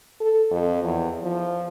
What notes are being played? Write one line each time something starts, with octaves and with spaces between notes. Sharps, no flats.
A4
F2
E2
F3